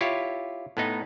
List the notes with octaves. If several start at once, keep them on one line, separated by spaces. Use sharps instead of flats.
E4 F4 G4 C#5
A2 B3 D#4